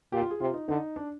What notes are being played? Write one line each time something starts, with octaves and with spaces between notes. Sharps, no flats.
A#2 G4
F4
G#4
C3 F4
D#4
D3 D#4
D4